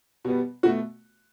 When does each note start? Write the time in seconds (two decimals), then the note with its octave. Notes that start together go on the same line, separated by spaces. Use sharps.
0.25 B2 G3 B3
0.63 B2 A3 F#4